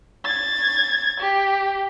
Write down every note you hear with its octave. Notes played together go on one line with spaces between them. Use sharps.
G#6 A6
G4